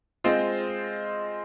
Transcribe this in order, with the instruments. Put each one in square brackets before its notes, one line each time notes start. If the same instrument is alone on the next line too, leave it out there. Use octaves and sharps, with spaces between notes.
[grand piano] G#3 C4 F4 C5 D#5